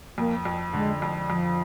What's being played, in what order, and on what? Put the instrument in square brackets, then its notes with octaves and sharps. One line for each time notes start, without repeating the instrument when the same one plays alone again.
[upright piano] F2 [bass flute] A#3
[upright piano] F2
[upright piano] D3 [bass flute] G#3
[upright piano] F2
[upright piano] F2 [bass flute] F3